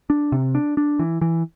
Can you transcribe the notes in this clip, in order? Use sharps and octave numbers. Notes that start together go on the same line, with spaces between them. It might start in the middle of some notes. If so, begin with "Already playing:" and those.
D4
C3
D4
D4
E3
E3